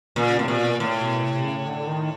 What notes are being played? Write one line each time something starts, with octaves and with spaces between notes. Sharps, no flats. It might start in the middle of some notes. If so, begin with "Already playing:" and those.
A#2 C#3
A2 C3
A#2
B2
A2
B2
C3
C#3
D3
D#3